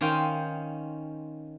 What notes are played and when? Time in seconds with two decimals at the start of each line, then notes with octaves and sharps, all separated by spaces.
0.01 D#3 C#4 C5 F5 G5